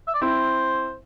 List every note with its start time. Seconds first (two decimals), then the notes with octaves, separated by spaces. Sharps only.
0.08 E5
0.14 D5
0.21 C4 E4 C5